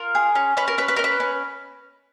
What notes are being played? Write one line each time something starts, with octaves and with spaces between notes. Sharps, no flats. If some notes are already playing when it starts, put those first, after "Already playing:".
Already playing: F4 A#4
G#4
C#4
C#4 B4
A#4
C#4 B4
B4
C#4 A#4
B4
C#4